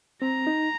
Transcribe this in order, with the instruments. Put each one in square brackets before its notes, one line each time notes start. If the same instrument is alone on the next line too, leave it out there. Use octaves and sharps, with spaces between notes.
[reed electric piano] C4 [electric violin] A#5
[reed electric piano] D#4